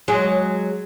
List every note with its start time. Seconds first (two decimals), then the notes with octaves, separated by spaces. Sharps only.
0.08 F#3 G#3